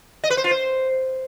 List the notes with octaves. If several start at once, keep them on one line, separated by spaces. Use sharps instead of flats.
D#5
B4
C5
F4
C5